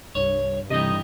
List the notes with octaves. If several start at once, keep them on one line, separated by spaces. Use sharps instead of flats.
C2 G2 C#5
C2 C3 E3 G3 A3 D#4 D#5